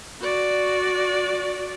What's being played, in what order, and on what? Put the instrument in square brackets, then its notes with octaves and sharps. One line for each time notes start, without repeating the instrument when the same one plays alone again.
[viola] F#4 D5